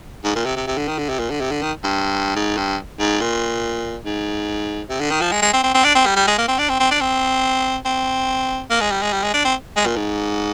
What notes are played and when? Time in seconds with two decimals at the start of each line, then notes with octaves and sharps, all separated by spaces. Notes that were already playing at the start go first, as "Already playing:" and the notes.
0.24 G#2
0.35 A#2
0.45 C3
0.56 C3
0.67 C3
0.77 D3
0.88 D#3
0.98 D3
1.09 C3
1.19 A#2
1.30 D3
1.41 C3
1.51 D3
1.62 D#3
1.83 G2
2.35 G#2
2.57 G2
2.99 G#2
3.21 A#2
4.05 G#2
4.89 C3
5.00 D3
5.10 D#3
5.21 F3
5.32 G#3
5.42 G#3
5.53 C4
5.63 C4
5.74 C4
5.84 D4
5.95 C4
6.06 G3
6.16 G3
6.27 G#3
6.38 A#3
6.48 C4
6.58 D4
6.69 C4
6.79 C4
6.91 D4
7.00 C4
7.85 C4
8.70 A#3
8.80 G#3
8.91 G3
9.02 G#3
9.12 G3
9.23 G#3
9.34 D4
9.45 C4
9.76 G#3
9.86 A#2
9.96 G#2